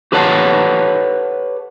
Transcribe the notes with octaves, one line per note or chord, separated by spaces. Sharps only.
G4 A4 B4 C#5 F#5 A5